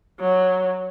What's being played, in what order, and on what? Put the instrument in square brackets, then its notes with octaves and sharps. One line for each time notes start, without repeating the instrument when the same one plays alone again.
[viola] F#3